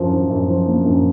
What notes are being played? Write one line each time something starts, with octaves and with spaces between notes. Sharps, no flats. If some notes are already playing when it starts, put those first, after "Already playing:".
Already playing: F#2 F3
F3
F#2
F3
A#3
F#2